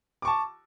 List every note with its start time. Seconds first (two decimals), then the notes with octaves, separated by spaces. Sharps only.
0.22 D6
0.25 C#6
0.27 A5